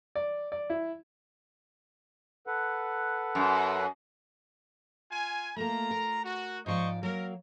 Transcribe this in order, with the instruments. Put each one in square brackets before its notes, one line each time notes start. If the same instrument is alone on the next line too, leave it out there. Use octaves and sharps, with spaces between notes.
[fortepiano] D5
D5
E4
[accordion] A4 B4 F#5
[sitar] F#2
[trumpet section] F4 G#5
[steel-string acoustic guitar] A3 A#3 [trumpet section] F4 A#5
[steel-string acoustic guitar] A#4
[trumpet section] F#4
[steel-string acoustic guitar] G#2 F3 D5 [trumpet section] C5 D#5 C#6
[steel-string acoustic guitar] F#3 A#3 [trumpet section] A#4